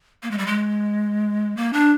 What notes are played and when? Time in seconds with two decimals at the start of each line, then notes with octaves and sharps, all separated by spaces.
0.23 A#3
0.31 G#3
0.38 G3
0.47 G#3
1.57 A#3
1.73 D4